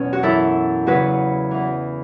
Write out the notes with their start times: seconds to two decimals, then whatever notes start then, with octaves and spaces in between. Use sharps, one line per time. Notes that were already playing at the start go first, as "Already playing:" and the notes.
Already playing: E2 B2 F#3 C#4
0.13 F#4
0.23 F#2 E3 E4 A4
0.86 E2 C#3 F#3 F#4 B4
1.51 E2 E3